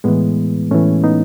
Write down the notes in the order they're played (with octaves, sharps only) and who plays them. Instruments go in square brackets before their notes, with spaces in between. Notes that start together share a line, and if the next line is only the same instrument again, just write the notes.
[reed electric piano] A2 E3 G#3 B3
A2 E3 A3 C#4
B3 D#4